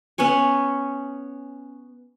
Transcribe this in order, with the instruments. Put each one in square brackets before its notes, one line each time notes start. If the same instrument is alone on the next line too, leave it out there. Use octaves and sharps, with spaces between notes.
[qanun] B3 C#4 C#5 G#5